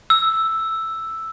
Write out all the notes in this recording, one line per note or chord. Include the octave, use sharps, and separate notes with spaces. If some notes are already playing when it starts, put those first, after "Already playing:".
E6